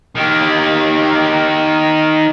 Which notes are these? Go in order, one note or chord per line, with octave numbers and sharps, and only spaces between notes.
D#3 G4